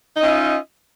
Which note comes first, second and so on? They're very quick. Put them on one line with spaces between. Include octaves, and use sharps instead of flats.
D#4 D#5 C#4 F4 E5